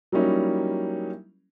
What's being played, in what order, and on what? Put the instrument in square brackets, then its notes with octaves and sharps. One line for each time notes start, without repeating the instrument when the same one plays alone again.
[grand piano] F#3 G3 A#3 C#4 D#4 E4